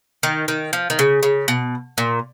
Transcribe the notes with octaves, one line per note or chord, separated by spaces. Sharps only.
D#3
D#3
F3
D#3
C#3
C#3
B2
A#2